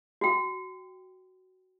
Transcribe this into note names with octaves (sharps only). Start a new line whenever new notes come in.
F#4 G5